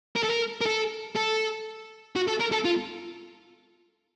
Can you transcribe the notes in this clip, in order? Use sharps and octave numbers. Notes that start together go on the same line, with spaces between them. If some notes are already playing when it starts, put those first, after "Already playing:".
A#4
A4
A#4
A#4
A4
A4
F#4
A4
A#4
A4
F4